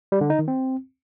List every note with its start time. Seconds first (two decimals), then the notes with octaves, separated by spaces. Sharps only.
0.12 G3
0.21 D3
0.30 D#4
0.39 D#3
0.48 C4